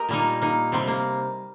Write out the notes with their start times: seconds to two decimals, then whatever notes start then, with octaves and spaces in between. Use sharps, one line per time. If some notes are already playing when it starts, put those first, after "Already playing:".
Already playing: G4 A#4 D#5
0.09 A#2 G3 A#3 D#4
0.42 A#3 D#4
0.72 C3 G3 C4
0.88 A#3